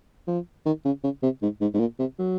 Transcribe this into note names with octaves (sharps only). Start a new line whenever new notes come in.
F3
D#3
C#3
C#3
C3
G#2
G#2
G#2
A#2
C3
F#3